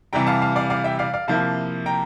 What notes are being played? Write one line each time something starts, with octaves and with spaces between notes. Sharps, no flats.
C3 E3 G3 G5 A#5
F5 A5
F5 A5
D5 F5
D5 F5
E5 G5
D5 F5
D5 F5
C3 F3 A#3 E4 F5 A5
G5 A#5